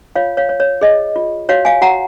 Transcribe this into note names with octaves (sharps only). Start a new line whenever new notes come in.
F4 C#5 F5
C#5 F5
C#5
C#5
G#4 D#5
F4
F#4 C#5 F5
F5 G#5
F#4 F#5 A#5